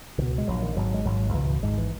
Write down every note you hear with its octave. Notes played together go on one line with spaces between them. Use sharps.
C#2 B2 D#3
G#3
A#1 A#2 F#3
D#3
G#1 G#2 F#3
G#3
G#1 G#2 F#3
F#3
C#2 B2 E3
E3
G#1 G#2 G#3
E3